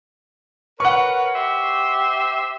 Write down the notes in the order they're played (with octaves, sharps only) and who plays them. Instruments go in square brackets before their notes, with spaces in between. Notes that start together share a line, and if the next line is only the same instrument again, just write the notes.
[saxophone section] A#4 B4 C#5 [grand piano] F#5 C#6
[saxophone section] G4 C5 E5